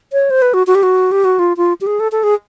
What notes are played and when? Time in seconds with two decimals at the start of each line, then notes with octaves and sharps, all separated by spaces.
0.13 C#5
0.30 C5
0.42 B4
0.54 F#4
0.67 F#4
0.75 G4
0.83 F#4
1.12 G4
1.25 F#4
1.39 F4
1.57 F4
1.81 G4
1.87 G#4
2.00 A4
2.12 A4
2.23 G#4